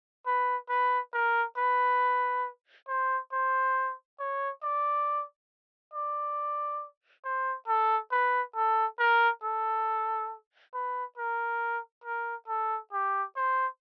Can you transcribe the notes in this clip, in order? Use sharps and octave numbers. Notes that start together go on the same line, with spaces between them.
B4
B4
A#4
B4
C5
C5
C#5
D5
D5
C5
A4
B4
A4
A#4
A4
B4
A#4
A#4
A4
G4
C5